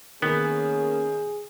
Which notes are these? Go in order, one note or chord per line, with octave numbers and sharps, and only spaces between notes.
D#3 A#3 B3 C#4 G#4